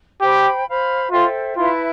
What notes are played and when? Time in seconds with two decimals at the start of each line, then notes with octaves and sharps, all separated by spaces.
0.21 G4 C5 G5 B5
0.67 C5 F5 B5
1.11 F4 A4 C5 E5 G5
1.56 E4 F4 B4 E5 A5